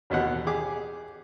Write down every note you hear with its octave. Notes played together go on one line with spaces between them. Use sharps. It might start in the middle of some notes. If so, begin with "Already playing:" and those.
A1 D#2 B2 F#5
G4 G#4 D6